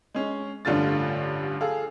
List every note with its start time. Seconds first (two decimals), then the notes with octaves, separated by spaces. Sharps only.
0.14 G#3 C#4
0.65 A1 G2 D3 F4 A6
1.61 G#4 A4 F5